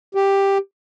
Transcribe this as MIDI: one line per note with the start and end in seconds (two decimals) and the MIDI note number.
0.15 0.58 67